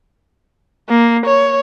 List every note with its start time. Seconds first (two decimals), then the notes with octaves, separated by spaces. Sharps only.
0.89 A#3
1.26 C#5